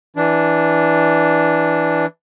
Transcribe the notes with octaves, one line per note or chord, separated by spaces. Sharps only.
E3 D4